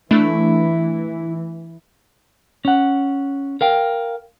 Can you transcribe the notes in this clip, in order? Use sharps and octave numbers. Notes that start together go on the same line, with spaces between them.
E3 A3 D4 E4
C#4 F#5
A#4 F5 G5